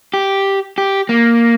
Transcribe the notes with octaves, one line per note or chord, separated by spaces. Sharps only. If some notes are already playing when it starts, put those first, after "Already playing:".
G4
G4
A#3